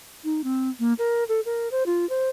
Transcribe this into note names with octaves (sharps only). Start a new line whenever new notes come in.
D#4
C4
A#3
A#4
A4
A#4
C5
F4
C5